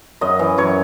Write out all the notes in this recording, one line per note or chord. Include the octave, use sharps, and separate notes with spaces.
F#2 D#5
E3
F#2 C#5